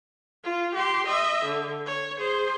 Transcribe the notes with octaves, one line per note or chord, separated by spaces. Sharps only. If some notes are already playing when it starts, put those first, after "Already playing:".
F4
G4 C6
D#5 E5
D3
C#5
G#4 C5